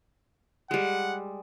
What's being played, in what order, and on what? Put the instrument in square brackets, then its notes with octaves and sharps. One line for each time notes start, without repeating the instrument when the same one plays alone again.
[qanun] G3 G#3 [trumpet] F#5